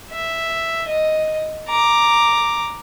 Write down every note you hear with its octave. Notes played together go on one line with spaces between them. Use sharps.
E5
D#5
A#5 D6